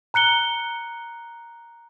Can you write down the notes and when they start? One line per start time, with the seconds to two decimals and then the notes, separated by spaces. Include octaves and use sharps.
0.14 A#5 F#6 C#7 G7